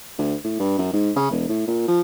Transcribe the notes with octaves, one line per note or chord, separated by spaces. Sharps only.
D2
A2
G2
F#2
G#2
C#3
E1
A2
A#2
F3